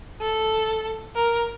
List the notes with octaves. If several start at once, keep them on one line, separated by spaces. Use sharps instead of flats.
A4
A#4